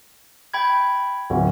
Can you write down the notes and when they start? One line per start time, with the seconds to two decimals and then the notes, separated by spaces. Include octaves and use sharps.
0.54 G5 B5 G#6
1.30 D1